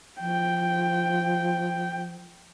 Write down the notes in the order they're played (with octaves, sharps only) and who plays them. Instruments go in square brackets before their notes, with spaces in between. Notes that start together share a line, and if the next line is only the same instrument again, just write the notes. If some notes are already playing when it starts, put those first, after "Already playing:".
[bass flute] F3 [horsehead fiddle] G5